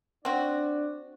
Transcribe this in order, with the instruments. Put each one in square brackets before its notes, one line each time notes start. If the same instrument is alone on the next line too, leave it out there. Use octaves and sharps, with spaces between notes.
[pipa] C4 F#4 [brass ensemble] D4 D5